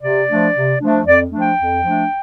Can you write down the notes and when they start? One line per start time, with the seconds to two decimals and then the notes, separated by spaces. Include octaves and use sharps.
0.02 C3 D5
0.29 F3 A3 D4
0.55 C3
0.81 F3 A3 D4
1.06 F2 D5
1.31 F3 A3 D4
1.41 G5
1.59 F2
1.84 F3 A3 D4